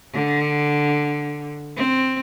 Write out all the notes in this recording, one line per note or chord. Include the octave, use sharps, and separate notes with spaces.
D3
C4